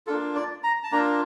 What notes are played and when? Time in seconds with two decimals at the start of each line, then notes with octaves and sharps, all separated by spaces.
0.07 A#3 D4 F4 A4
0.35 D5
0.64 A#5
0.84 A5
0.92 A#3 D4 F4 A#5